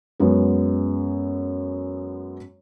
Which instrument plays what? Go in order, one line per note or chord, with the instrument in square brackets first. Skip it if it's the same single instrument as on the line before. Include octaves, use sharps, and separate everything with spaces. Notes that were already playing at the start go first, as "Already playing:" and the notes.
[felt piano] F#2 G#3 B3